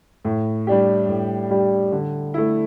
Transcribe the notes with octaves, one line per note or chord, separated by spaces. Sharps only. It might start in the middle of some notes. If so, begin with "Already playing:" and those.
A2
G3 D4 G4
A2
G3 D4 G4
D3
A3 E4